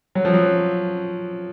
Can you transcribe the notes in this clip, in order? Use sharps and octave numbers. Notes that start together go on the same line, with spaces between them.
F#3
F3
F#3